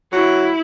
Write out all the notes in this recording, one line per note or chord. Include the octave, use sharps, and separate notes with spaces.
F#3 E4